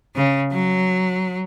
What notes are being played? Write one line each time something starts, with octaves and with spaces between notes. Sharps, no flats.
C#3
F#3